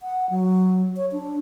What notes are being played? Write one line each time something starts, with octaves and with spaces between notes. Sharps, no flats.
F#5
F#3
C#5
D4